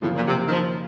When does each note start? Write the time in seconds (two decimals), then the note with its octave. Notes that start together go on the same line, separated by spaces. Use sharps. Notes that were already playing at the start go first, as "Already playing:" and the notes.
0.02 F#2 A2 C#3 F3 A#3 F4
0.15 A#2
0.27 C3
0.47 D#3
0.50 F3